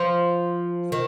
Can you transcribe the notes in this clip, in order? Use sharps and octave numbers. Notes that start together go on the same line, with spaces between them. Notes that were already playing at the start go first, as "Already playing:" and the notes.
Already playing: F3
D#3